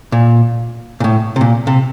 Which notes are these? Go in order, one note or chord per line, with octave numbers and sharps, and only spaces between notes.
A#2
A#2
A2
C3
A#2
C3